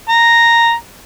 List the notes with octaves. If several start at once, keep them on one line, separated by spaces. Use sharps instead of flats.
A#5